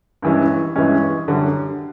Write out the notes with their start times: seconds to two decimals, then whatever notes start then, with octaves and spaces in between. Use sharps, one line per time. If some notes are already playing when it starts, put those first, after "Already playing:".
0.22 G2 E3 G#3 C#4
0.76 G2 E3 G#3 C#4
1.28 F#2 D3 G3